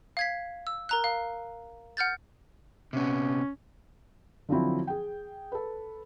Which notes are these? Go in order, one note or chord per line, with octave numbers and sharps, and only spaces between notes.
F5 G#6 B6
E6
A#4 A#5 F#6
F5
F#5 F6 G6 A6
C3 B3 C#4
D3 F3 F#3 C4 E4
G#4 G5
A4 B4